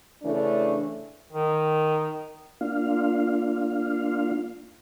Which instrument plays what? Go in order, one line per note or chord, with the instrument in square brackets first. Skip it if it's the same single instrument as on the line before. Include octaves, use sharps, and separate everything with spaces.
[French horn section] C#3 E3 A3 C#4 D4
[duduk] D#3
[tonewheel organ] A#3 D4 F4 F5